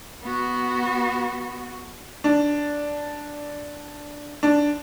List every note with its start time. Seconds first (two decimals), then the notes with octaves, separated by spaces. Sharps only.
0.23 B3 F#4
2.24 D4
4.43 D4